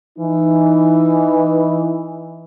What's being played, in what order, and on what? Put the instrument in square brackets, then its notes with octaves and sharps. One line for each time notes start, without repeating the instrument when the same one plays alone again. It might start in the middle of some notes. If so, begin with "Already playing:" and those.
[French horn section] E3 D#4